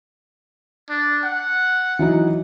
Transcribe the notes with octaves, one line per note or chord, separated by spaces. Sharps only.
D4
F#5
E3 F#3 D#4